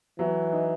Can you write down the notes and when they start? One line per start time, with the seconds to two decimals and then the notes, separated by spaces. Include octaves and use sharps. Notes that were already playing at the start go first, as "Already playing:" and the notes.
0.19 E3 F#3
0.52 D#4